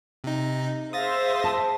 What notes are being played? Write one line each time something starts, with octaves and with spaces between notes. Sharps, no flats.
C3 D#4
G#4 C5 E5 F5 D#6 A6 A#6
A5